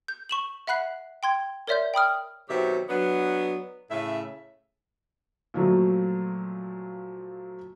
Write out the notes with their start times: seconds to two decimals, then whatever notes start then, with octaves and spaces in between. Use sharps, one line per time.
0.08 G6
0.29 C#6 E7 F#7
0.67 E5 F#5 B5 F#6 C7
1.23 G5 C6 G#6
1.67 A#4 C#5 D5 E5 C6 G6
1.94 G5 B5 D#6 F6
2.49 B2 D#3 F#3 C4 G4 E5
2.89 F#3 B3 D4
3.90 A2 C#3 E5
5.54 A#2 F3 F#3 A3